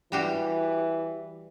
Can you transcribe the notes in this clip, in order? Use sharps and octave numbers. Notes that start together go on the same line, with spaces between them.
E3 G3 F#4 G4